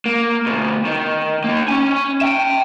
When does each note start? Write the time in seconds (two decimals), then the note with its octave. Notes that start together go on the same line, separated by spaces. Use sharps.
0.06 A#3
0.46 D2 B2
0.85 D#3
1.44 A#3 D#4
1.68 C#4 G#5
2.21 E5 G5